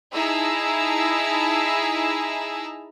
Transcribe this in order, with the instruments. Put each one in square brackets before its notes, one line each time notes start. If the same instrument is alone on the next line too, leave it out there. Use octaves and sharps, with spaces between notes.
[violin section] D#4 E4 G#4 A5 A#5 E6